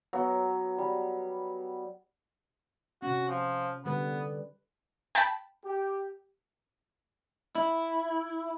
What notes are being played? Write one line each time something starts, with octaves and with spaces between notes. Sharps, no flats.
F#3 B3
G3
C3 C#4 F#4
F3
D3 G3 B3 B4
G5 A5 B5
G4
E4